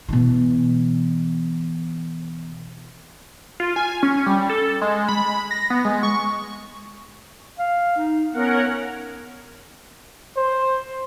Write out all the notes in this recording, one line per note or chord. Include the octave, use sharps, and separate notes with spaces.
B2 E3
F4
G#5
C#4
G3
A4
G#3
B5
A#6
B3
G#3
C#6
F5
D#4
B3 C#4 A#4 F#5
C5